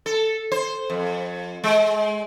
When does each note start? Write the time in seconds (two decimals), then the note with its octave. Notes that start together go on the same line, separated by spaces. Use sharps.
0.06 A4
0.52 C5
0.90 F2
1.64 G#3